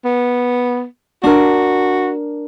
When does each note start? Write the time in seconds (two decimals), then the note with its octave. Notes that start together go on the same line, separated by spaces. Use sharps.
0.05 B3
1.24 D4 F#4 A#4